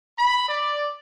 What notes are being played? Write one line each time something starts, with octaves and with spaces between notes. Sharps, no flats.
B5
D5